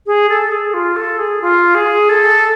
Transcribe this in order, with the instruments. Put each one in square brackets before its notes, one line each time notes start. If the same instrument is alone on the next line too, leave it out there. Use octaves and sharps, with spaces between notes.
[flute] G#4
A4
G#4
F4
A4
G#4
F4
G#4
A4